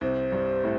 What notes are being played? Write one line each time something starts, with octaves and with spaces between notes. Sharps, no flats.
C2 C3 C5
G2 G3
A2 A3